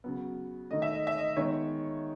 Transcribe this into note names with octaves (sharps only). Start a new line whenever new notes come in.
C#3 F#3 B3
D#3 A3 D#5
E5
D#5
E5
D#5
D#3 G#3 B3 C#5